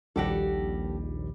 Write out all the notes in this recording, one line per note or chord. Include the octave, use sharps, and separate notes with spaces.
A#1 D#2 G3 F#4 G4 A4